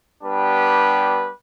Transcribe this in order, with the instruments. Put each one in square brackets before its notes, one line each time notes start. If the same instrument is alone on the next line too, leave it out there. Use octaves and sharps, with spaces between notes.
[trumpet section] G3 B3 D4 G4 B4